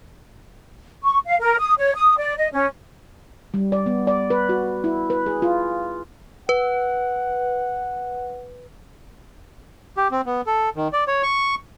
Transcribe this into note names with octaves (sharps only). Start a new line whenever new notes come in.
C#6
F5
A#4
D#6
C#5
D#6
D5
D#5
C#4
G3
D5
B3
D5
B4
F#4
E4
B4
G#4
F4
B4 F#5
G4
C4
B3
A4
D#3
D5
C#5
C#6